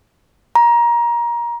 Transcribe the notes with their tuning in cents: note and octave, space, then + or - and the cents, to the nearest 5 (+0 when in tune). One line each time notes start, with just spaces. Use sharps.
A#5 +25